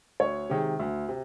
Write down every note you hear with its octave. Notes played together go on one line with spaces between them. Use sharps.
D2 C#5
C3 D#3 G#3
D2
C3